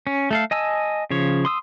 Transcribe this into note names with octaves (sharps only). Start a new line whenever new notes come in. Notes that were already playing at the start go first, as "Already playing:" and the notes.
C#4
A3 A4 F5
D#5 G#5 A5 E6
C#3 F3 C#5
C6 D#6 E6